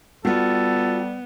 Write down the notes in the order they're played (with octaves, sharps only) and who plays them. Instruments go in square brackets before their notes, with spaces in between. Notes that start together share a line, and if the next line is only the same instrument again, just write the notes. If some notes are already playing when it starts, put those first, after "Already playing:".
[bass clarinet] G3 [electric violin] B3 [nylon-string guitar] F4 F#4 [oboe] A4